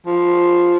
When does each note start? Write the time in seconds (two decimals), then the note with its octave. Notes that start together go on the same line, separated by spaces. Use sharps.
0.06 F3